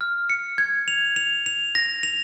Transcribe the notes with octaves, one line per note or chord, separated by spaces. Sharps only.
F6
C#7
G#6
F7
F7
F7
A#6
F7